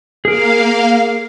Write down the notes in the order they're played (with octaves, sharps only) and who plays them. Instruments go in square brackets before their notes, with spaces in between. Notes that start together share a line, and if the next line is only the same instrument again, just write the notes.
[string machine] A#3 F5 [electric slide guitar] G#4 A#4